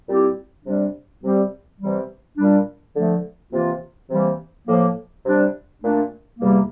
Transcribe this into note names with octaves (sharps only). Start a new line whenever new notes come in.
A#2 G3 C4 E4 G4
C3 G3 D4
C3 G3 C4 G4
C3 E3 G3
A#2 G3 D4
D3 F3 A3
C3 E3 A#3 F4
C3 E3 G3 A#3
A2 F3 A#3
C3 G3 D4
A#2 A3 D4
E2 C3 G3 A#3